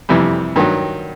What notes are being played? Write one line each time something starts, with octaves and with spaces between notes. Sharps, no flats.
F2 C3 E3 G3
G2 D#3 F#3